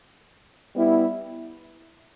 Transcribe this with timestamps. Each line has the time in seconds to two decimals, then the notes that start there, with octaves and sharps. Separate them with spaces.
0.75 G3 B3 E4